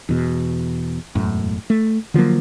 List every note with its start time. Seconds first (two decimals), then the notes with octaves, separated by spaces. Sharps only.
0.09 E2 B2
1.15 E1 F#2 A2
1.70 A3
2.14 D3 F3 F#3 A#3